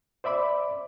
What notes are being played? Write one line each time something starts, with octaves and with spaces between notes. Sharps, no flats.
C5 D5 E5 B5 D6